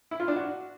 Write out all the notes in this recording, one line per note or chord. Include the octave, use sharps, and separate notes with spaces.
E4
F4
D4
F#4